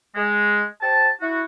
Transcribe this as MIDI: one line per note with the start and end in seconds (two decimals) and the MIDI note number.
0.15 0.63 56
0.81 1.09 67
0.81 1.09 72
0.81 1.09 81
1.21 1.43 64
1.21 1.43 66